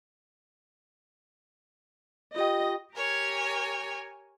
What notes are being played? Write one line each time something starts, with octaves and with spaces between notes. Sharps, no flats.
F4 G4 D#5 G5
G4 A#4 C#5 G#5